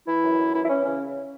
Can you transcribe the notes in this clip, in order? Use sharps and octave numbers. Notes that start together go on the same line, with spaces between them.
E3 E4
F#2
F#2
E3 E4
E4
E3 C#4
C#3 C#4